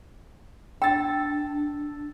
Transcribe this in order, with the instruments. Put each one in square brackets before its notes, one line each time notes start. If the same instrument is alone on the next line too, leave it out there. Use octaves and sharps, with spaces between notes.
[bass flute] D4 [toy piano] G5 [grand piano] E6 A6